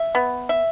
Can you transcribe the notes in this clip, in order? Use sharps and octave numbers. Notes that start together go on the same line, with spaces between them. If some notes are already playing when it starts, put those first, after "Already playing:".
Already playing: E5
B3
E5